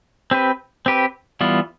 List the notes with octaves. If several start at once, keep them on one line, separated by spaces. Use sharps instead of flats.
C4 G4 B4
C4 G4 B4
E3 G3 B3 F4